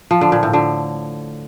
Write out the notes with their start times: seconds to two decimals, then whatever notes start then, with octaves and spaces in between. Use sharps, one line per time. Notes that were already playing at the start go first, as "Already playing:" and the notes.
0.11 F3
0.21 D3
0.32 A#2
0.43 A2
0.53 D3